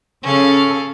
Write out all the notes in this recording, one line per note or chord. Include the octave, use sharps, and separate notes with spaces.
C#3 C#4 A4 F5